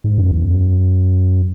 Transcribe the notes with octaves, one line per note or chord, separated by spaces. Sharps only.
G#2
F#2
E2
F#2